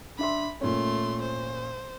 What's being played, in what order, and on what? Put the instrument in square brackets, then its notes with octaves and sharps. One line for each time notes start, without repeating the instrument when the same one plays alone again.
[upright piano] D4 E5 C6 [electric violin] B5
[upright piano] A#2 C#4 [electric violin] A3 C6
[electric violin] C5